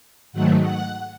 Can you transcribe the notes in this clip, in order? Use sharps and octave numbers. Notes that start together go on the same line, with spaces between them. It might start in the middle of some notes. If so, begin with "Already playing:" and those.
G#2 D#3 F#3 A3 F#5
F#5